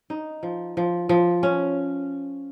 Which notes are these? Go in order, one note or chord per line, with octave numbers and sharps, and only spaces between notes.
D#4
F3
F3
F3
C#4